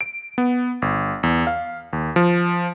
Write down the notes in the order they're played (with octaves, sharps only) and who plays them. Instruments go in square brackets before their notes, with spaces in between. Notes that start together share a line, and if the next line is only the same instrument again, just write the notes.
[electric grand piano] D7
B3
G1
E2
F5
D#2
F3